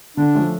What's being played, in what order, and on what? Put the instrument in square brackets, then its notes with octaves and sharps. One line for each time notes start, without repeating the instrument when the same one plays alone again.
[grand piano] D3 [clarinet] D4
[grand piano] F3 A3 C#4